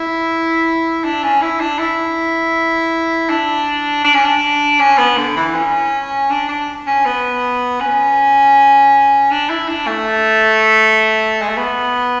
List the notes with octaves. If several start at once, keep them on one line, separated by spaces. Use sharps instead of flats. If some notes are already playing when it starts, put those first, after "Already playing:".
Already playing: E4
D4
C#4
E4
D4
E4
D4
D4
C#4
D4
C#4
B3
D3
E3
C#4
D4
D4
C#4
B3
C#4
D4
E4
D4
A3
G#3
A3
B3